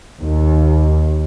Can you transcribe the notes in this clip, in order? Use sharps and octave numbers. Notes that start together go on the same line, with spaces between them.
D#2